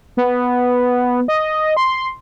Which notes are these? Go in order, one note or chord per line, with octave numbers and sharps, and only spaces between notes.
B3
D#5
C6